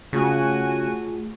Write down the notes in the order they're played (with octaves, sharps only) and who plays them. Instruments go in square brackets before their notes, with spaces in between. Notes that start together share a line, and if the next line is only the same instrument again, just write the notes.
[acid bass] C#3 [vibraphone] A3 F4 G#4 [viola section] F#4 G#5